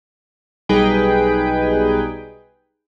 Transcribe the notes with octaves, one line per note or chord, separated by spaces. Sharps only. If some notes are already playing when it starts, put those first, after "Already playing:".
B1 G3 D#4 G#4 B4 G5